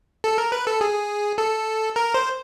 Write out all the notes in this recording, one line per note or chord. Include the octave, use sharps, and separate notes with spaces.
A4
A#4
B4
A4
G#4
A4
A#4
C5